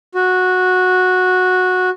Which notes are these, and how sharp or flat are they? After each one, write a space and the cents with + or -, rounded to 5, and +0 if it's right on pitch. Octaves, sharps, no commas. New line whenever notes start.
F#4 -10